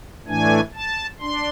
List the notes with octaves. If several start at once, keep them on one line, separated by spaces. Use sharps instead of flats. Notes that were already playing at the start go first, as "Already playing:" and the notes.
A2 E3 A3 D4 G#5
A5
D4 C6